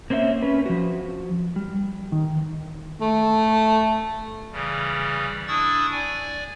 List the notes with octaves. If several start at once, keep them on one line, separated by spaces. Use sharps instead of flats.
A#3 C4 C#4 F4 E5
C#4 B4
F3 F#4
G3
D#3
A3
C#3 E3 G3
D4 E4 C#6 D#6 E6 A6
D5 G#5